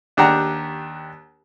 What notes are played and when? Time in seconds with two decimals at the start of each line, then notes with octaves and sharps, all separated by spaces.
0.17 D#2 D4 G4 F#5 G5 A#5